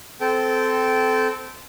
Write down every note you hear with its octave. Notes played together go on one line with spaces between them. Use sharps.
C4 A4 G5